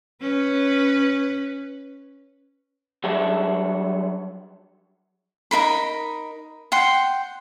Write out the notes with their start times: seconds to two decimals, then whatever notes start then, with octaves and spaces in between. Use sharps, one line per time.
0.22 C#4 B4
3.04 F#3 G3 D4 G#4 A4 E5
5.51 D#4 E4 A#4 B5
6.72 F#5 G5 C6